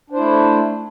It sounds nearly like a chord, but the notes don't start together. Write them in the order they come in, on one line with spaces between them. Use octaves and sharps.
D4 C5 E4 A3